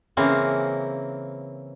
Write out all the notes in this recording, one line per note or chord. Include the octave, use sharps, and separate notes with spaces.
C#3 E3 A#3 C4